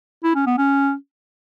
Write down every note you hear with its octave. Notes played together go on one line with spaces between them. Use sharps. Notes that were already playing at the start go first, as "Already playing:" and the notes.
E4
C#4
B3
C#4